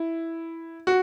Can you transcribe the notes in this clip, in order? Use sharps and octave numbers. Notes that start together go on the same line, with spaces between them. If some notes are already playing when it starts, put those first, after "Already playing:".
Already playing: E4
F#4